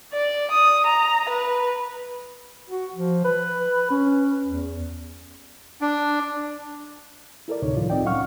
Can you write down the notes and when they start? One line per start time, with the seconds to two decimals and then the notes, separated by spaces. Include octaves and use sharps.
0.13 D5
0.51 D#6
0.87 A#5
1.29 B4
2.70 F#4
2.94 F3
3.24 B4
3.91 C#4
4.45 E2
5.81 D4
7.48 E4 A4 A#4 D5
7.62 D2 A2 C3 D#4 C#5
7.76 A2 D#3 F3 F4
7.90 C2 C4 D#4 D5 D#5 G5
8.05 F#3 C#4 F5 F#5 C#6 F6